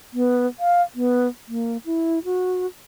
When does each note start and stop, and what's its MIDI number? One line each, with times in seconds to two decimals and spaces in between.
0.13 0.47 59
0.60 0.82 77
0.95 1.28 59
1.48 1.77 58
1.85 2.19 64
2.25 2.66 66